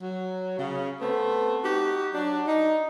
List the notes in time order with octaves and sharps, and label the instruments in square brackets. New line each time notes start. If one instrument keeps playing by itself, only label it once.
[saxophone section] F#3
C#3
A3 B3 C4
D#4 F#4 G4
F#3 D4
D#4